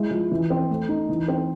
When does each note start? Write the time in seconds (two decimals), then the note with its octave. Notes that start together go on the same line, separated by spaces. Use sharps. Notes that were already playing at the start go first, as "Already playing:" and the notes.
Already playing: G#3 E4
0.11 F3
0.31 E3
0.50 C4
0.70 A3
0.89 D#4
1.09 E3
1.28 C4